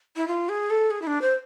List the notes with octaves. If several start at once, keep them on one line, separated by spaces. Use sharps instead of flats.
E4
F4
G#4
A4
G#4
E4
D4
C5